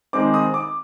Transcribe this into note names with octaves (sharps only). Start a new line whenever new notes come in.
D#3 G#3 C4 D6
D#6
D6